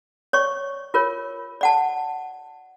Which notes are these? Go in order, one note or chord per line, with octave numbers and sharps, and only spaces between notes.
C#5 D5 C#6
F4 A#4 C#5
D5 F#5 A5